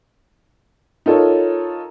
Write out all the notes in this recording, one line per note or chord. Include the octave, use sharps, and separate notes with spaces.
D#4 F4 A4 A#4 C#5